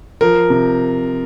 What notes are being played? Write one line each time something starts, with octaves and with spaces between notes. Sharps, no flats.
F3 A#4
C3